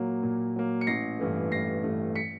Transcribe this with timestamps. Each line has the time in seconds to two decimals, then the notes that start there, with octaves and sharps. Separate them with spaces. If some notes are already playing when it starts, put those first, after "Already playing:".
Already playing: A#2 F#3 A#3
0.23 A#2
0.56 F#3 A#3
0.81 C#7
0.87 A1 A#6 C7
1.19 G2 E3 A3
1.52 A1 A#6 C7
1.83 G2 E3 A3
2.16 B6 C#7